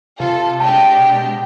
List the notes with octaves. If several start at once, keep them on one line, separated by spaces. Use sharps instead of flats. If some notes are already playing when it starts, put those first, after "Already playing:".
C3 F4 A4
G#3 D4 G4 G5 A5
B2